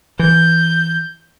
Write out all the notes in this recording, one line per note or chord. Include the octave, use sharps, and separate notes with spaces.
E3 G6